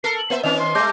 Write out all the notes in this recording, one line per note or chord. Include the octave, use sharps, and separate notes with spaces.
A4 A#4 C7
F#7
A#3 C5 E5
D#3 C4 C#4 D#5 F7
C6
G3 A3 D6 G6 A#6